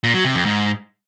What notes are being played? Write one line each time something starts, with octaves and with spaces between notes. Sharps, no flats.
A#2
F#3
C3
F2
G#2